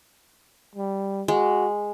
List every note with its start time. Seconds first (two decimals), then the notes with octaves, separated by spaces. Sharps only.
0.76 G3
1.28 G#3 F#4